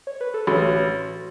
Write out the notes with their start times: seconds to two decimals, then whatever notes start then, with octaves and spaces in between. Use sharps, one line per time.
0.07 C#5
0.21 B4
0.34 A4
0.47 A1 F#4